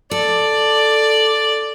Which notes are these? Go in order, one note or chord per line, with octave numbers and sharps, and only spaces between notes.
A4 D5